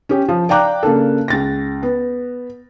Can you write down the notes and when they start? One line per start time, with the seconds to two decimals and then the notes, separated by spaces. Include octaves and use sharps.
0.09 C#4 G4
0.29 F3
0.49 D5 F5 G5 A#5 D6 F#6
0.83 C#3 A#3 D4 A4
1.28 C#2 A6 A#6
1.83 B3